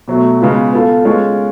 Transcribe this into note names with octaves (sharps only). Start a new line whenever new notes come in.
B2 F#3 A3
C#3 G#3 B3 F4
B3 F4 A4
G#3 C#4 F4